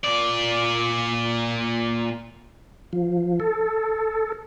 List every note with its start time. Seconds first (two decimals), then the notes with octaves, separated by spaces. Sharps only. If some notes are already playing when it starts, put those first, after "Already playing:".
0.04 A#2 D5
2.93 F3
3.40 A4